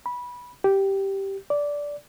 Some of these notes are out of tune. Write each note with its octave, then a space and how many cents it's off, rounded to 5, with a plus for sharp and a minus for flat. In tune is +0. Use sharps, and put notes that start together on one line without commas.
B5 -15
G4 -5
D5 -10